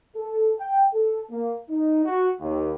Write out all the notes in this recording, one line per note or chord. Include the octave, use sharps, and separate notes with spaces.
A4
G5
A4
A#3
D#4
F#4
D#2